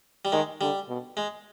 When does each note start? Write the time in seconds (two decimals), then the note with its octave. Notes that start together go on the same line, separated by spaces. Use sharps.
0.25 G3
0.32 D#3 G#3
0.61 D3 G3
0.89 B2
1.17 G#3